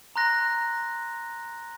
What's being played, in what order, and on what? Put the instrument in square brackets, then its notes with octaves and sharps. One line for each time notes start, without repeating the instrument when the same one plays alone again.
[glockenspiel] A#5 C6 F#6 A#6